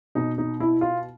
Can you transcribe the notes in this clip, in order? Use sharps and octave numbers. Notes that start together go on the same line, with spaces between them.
B2 D#4
D#4
E4
F4